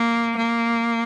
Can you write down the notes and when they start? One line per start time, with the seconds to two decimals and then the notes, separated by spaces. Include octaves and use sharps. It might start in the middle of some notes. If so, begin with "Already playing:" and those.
Already playing: A#3
0.36 A#3